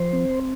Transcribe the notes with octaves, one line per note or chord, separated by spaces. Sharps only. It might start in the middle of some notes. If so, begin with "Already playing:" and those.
Already playing: F3 C5
C4